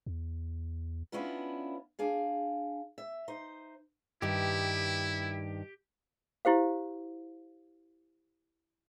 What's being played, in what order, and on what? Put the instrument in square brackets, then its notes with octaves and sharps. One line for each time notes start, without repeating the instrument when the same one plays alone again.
[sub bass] E2
[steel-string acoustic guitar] B3 C#4 D4 E4 F4 B4
D4 G#4 F5
E5
D#4 C5
[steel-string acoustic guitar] G2 D#3 [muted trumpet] E4 [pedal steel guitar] G4
[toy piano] E4 G4 C5 F5